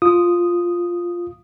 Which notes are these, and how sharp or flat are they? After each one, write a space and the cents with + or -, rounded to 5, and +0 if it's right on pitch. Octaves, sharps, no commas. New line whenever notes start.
F4 +0 D#6 -5